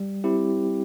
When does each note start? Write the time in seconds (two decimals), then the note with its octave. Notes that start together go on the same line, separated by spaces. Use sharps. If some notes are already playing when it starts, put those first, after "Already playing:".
Already playing: G3
0.24 C4 E4 G4